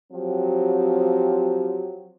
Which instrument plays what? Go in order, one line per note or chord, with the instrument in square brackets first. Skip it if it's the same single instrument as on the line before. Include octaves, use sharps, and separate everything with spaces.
[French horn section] F3 F#3 C4 G4